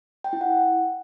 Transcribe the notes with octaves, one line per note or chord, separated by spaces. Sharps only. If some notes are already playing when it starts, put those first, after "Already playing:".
G5
E4
F#5